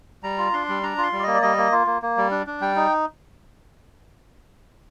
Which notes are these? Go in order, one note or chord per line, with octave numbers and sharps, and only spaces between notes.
G3 A#5
F4
D4 C6
G3
D4 A#5
F4
C6
G3
D5
A#3 D#5
D5
G3 D#5
A#3
F4
A#3
A#3
G3
D4
D4
G3 G5
D#4